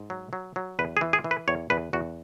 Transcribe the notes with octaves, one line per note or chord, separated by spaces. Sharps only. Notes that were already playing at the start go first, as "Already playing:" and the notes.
Already playing: G#2
F#3
F#3
F#3
E2 B4
G#4
E3
G#4
E3
B4
E2 C#5
E2 B4
E2 F#4